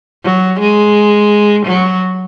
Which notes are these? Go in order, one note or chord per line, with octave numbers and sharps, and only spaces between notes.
F#3
G#3
F#3